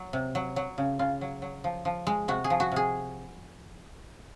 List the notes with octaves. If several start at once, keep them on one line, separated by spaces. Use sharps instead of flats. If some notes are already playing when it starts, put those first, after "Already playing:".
Already playing: F#3
C3
F#3
F#3
C#3
C#3 F4
F#3
F#3
F3
F3
G#3
C3 F#4
G#4
F3
F#4
C3 G#4